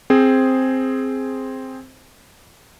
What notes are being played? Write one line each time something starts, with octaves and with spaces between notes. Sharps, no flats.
C4 G#4 C5